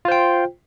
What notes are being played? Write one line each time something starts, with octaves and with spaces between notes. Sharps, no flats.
F4 C5 G5